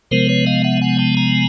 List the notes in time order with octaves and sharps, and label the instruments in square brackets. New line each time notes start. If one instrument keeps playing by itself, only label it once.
[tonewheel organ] C3 F3 G#3 B3 A#4 C5
B4 C#5
D#5 F5
E5 F#5
F#5 G#5
G5 A5
G#5 A#5